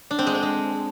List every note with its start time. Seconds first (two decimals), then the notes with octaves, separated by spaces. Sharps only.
0.11 D4
0.19 C4
0.27 G#3
0.35 C4
0.43 G#3